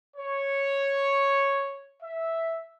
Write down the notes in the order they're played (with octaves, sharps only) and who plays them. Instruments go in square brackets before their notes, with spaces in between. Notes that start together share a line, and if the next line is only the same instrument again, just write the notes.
[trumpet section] C#5
E5